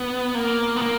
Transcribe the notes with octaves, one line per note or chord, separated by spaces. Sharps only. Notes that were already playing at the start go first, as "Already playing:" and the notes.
Already playing: B3
A#3
B3
A#3